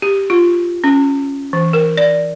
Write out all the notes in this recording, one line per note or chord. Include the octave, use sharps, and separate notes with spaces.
G4
F4
C#4
E3
A#4
D5